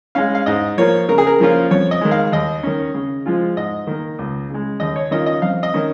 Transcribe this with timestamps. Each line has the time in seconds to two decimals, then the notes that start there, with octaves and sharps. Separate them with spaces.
0.15 G#3 C#4 F5
0.35 F5
0.46 G#2 D#5
0.77 F3 A#3 F4 C#5
1.09 C#3 A#4
1.18 G#4
1.27 A#4
1.40 F3 A#3 C#4 F4
1.71 F2 C#5
1.91 D#5
2.01 D#3 G#3
2.11 F5
2.32 D#2 D#5
2.63 D#3 C#4
2.94 C#3
3.26 F3 G#3 F4
3.57 G#2 D#5
3.87 D#3 A#3
4.19 C#2
4.50 C#3 G#3
4.80 D#2 D#5
4.96 C#5
5.11 D#3 C#4 F4 D#5
5.26 D#5
5.42 F2 F5
5.63 D#5
5.74 D#3 C#4